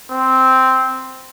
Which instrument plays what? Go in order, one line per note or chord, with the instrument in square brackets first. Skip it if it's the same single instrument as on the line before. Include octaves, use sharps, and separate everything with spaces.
[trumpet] C4